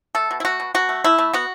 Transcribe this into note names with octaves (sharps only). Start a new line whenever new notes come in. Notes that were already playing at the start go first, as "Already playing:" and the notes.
A3 A4
B2
E4
A3 F#4
B2
B2 F#4
A3
A3 E4
A3
B3 F#4